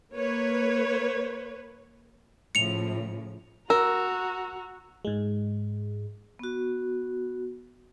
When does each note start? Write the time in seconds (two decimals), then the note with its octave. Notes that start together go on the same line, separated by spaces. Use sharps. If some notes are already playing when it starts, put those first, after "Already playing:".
0.14 A#3 B4 C#5
2.55 A2 C#3 F3 C#7 F7
3.70 F#4 A#4 A#5 E6
5.05 G#2 G#3
6.39 B3 F#4